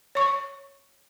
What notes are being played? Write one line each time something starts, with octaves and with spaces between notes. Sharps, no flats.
C#5 C#6